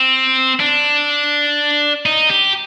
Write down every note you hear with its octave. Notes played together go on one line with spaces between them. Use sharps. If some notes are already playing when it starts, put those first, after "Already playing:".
Already playing: C4
D4
D#4
G4